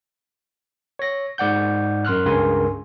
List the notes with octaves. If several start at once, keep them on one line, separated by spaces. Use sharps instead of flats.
C#5 A#6
G#2 D5 F#5 G6
F#2 C6 F6 F#6
C#2 G2 C#3 A#4 G#5 C6